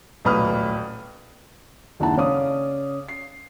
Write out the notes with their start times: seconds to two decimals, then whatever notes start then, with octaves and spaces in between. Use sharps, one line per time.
0.25 D#1 B1 A2 B4 D#6 F6
2.00 F#1 D#2 D4 E4 F#5 A5
2.17 C#3 C#4 D5 F5 D6 D#6
3.08 C7